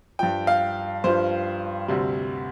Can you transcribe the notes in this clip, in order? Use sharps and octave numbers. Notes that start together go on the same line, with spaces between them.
G2 F3 G5
F5
G2 F3 C5
D2 C3 G3